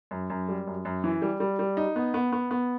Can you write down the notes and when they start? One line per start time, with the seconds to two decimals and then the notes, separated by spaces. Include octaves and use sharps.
0.11 F#2
0.30 F#2
0.49 G3
0.67 F#2
0.85 F#2
1.04 E3
1.22 G3
1.40 G3
1.59 G3
1.77 D#4
1.96 B3
2.14 B3
2.32 B3
2.51 B3